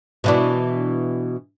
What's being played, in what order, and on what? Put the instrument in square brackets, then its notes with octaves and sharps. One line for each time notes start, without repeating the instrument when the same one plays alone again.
[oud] B2 E3 D4